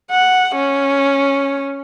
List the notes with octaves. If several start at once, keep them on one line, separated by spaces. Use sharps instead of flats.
F#5
C#4